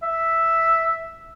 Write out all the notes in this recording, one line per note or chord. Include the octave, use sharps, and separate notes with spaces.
E5